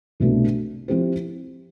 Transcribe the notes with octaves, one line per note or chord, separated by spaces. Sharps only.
C2 B2 A3 D4
F3 C4 E4 G4 C5